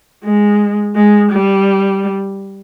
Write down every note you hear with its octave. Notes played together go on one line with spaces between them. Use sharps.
G#3
G#3
G3